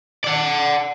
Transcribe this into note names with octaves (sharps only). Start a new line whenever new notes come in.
D5 F#5